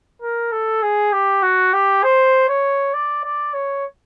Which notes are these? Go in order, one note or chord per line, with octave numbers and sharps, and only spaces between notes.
A#4
A4
G#4
G4
F#4
G4
C5
C#5
D5
D5
C#5